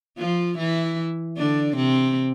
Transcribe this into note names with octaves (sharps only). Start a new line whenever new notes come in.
F3 F4
E3 E4
D3 D4
C3 C4